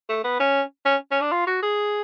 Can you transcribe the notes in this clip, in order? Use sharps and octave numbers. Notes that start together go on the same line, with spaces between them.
A3
B3
C#4
C#4
C#4
D4
F4
F#4
G#4